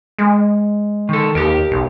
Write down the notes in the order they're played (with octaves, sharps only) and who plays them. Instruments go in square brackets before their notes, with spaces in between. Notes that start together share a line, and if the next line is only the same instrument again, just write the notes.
[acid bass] G#3
[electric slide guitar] D#3 A4
[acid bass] D#2 [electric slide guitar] G4 A#4
[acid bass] B1